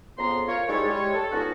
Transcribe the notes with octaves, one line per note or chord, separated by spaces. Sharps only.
F2 C#3 B3 A#5 C6
F4 A#4 C#5
G3 G#3 D#4 E4 A4 C#5
G3 G#3 C#5
A4
B3 C#4 D#4 F4 F#4